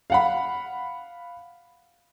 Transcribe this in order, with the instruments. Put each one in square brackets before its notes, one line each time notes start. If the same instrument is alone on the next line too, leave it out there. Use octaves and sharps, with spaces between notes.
[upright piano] F5 F#5 B5